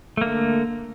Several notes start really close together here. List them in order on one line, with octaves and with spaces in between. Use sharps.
A3 A#3 D3